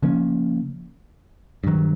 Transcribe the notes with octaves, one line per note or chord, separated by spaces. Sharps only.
C#3 F3 A#3 C#4
G2 D#3 F#3